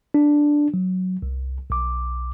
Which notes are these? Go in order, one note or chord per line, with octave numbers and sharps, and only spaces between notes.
D4
F#3
C2
B1 D6